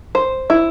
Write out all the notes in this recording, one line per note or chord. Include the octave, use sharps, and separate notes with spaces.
C5
E4